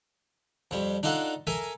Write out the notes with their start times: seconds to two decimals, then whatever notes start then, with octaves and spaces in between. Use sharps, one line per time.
0.71 F2 G3
1.03 D4 D#4 F4 A4 F#5 A5
1.47 A4 A#4 E5 G#5